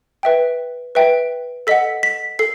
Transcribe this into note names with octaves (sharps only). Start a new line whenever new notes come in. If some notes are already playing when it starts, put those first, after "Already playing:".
B4 E5 G5
B4 E5 G5
A4 D#5 F#5 B6
B6
A4 C7